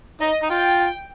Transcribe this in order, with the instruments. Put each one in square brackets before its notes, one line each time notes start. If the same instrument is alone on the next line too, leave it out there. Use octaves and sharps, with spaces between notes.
[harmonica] D#4 [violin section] D#5
[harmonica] D#4
[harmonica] F4 [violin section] G5